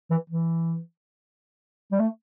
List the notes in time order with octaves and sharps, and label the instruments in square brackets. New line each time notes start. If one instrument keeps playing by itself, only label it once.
[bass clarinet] E3
E3
G3
A3